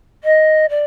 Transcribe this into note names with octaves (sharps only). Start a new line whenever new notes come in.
D#5
D5